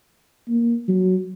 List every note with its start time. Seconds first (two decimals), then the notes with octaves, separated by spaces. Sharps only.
0.49 A#3
0.88 F#3